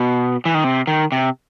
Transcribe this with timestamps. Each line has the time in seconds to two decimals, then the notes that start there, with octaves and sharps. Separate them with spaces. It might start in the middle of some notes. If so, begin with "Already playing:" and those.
Already playing: B2
0.45 E3
0.54 D#3
0.64 C3
0.87 D#3
1.12 C3